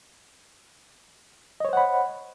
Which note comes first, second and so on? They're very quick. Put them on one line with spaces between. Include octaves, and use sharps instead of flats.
D#5 C#5 C5 F#5 B5